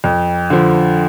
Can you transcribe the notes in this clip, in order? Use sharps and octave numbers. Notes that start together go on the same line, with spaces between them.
F2
D3 F3